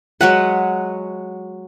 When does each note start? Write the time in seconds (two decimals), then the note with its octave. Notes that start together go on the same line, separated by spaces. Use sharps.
0.21 F#3 G#3 B4 F#5